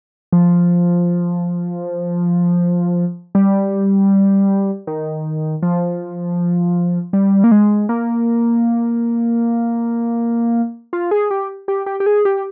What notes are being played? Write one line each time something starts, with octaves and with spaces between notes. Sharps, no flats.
F3
G3
D#3
F3
G3
A#3
G#3
A#3
F4
G#4
G4
G4
G4
G4
G#4
G4